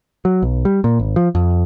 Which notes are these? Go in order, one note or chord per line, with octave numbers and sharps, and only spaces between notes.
F#3
B1
G3
A#2
G#1
F3
F2